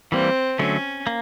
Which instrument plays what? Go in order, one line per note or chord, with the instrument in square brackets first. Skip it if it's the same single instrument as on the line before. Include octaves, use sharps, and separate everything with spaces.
[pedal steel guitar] E3 G3 A#3 [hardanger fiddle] C4
[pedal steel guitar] D3 F#3 A3 [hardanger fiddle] C#4
[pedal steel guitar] A#3